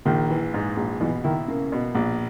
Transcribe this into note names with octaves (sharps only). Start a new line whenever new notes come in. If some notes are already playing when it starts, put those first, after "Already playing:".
A#1 D#3
E3
G#2
A#1
B2 E3
D#3 E4
C#3 A#3
B2
A#1